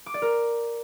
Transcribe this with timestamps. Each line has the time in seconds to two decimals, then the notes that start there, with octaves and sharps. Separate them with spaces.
0.06 D6
0.14 D5
0.22 A#4